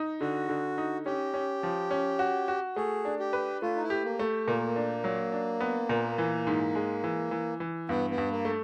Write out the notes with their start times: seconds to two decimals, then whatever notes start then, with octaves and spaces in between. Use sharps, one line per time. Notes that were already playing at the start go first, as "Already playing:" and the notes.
Already playing: D#4
0.21 D3 F#4
0.49 D3
0.78 D#4
1.06 C#4 G4
1.34 C#4
1.63 F3
1.91 C#4
2.19 F#4
2.48 F#4
2.76 A3 G#4
3.05 D4
3.19 G4
3.33 B4
3.62 A3 F4
3.76 D#4
3.83 E4
3.90 G4
4.04 A#3
4.19 A3
4.47 A#2 A#3
4.76 D4
5.04 F#3
5.32 D4
5.60 B3
5.89 A#2
6.18 E3
6.47 G#2
6.75 G#3
7.04 E3
7.31 E3
7.60 E3
7.89 G2 B3
8.10 B3
8.18 G2
8.31 A#3
8.45 A3